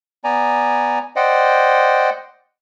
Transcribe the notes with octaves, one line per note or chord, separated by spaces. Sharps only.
B3 D5 G#5 A#5
C5 D5 D#5 F#5 G5